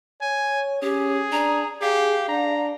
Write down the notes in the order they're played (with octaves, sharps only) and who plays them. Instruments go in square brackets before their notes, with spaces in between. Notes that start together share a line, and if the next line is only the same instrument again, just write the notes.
[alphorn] C#5 [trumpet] G#5
[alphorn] C#4 [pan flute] G4 [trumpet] G#4
[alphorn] D4 [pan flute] A#5
[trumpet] G4 [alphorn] G#4 [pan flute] F5
[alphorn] D4 [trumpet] A#5